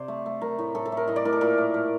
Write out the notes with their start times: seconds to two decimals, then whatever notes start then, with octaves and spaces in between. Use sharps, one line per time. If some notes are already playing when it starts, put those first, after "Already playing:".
Already playing: C3 C5 D5
0.08 A3
0.26 A3
0.41 A3 A#4
0.59 A2
0.75 A2 A4
0.85 A4
0.92 A3 A#4
1.08 A2 D#5
1.16 D5
1.25 A2 A#4
1.33 A4
1.41 A#2 A#4
1.58 A3
1.74 A3